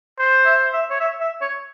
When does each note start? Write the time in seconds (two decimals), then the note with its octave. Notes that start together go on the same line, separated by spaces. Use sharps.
0.19 C5
0.45 E5
0.73 E5
0.90 C#5
1.00 E5
1.21 E5
1.41 C#5